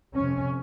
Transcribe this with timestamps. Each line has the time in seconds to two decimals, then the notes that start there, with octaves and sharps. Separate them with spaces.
0.15 F2 C3 C#4